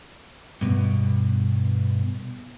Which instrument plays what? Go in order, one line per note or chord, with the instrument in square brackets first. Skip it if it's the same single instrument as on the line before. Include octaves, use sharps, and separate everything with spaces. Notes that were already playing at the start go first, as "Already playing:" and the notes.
[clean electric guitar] G2 B2